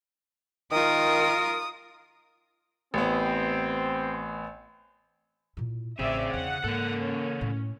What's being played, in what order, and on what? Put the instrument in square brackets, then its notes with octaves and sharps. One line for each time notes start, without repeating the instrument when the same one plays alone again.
[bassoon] D#3 [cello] F4 A#4 [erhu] D#6
[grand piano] A1 B3 [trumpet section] C4
[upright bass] A#2 E4
[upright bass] A1 [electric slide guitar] C#3 G#4 [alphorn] C4 [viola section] D5 E5
[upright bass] E2 D3 [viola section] F#5
[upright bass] G#2 [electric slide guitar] C#3 A4 [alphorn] A#3
[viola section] C#4
[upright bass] A2